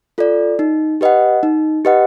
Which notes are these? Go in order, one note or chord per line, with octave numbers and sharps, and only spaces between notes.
F4 A4 D5
D#4
G4 B4 D#5 F#5
D#4
G4 B4 D#5 F#5